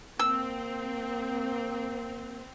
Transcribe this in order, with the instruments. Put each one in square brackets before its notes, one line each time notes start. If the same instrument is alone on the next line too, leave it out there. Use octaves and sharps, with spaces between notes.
[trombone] A#3 [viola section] C4 [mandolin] E6